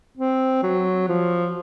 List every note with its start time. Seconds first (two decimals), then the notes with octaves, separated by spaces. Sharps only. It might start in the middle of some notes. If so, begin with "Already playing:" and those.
0.17 C4
0.63 F#3
1.08 F3